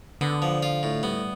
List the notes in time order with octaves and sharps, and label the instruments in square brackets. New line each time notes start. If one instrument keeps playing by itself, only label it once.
[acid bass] D3 [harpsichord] B3
[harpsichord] F3
F4
A2
[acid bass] G3 [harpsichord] B3